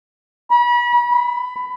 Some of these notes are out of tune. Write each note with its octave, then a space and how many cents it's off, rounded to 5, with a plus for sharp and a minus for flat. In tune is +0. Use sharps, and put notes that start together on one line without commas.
B5 -35
B5 +20